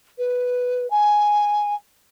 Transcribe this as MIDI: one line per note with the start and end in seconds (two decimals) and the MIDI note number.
0.18 0.89 71
0.90 1.74 80